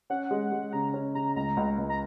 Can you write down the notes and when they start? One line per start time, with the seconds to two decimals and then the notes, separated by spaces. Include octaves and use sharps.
0.10 C#4 F#5
0.31 G#3
0.52 G#3
0.73 C#3 A#5
0.94 C#4
1.15 C#3 A#5
1.36 C#2 A#5
1.57 C#2
1.78 C#2
1.89 A#5